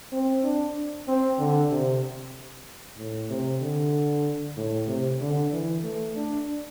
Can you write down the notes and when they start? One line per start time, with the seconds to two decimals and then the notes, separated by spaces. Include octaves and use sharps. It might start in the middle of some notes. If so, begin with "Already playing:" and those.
0.12 C4
0.44 D4
1.08 C4
1.39 D3
1.70 C3
2.98 A2
3.30 C3
3.61 D3
4.57 A2
4.88 C3
5.21 D3
5.53 E3
5.83 A3
6.16 D4